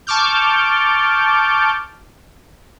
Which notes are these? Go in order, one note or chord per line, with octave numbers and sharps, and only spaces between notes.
A5 C#6 D6 F6 G6